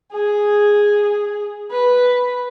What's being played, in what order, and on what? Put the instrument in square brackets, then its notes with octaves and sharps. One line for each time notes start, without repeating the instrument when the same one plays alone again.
[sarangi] G#4
B4